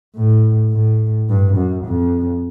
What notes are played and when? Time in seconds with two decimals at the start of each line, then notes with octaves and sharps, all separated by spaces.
0.15 A2
0.72 A2
1.29 G2
1.57 F#2
1.85 F2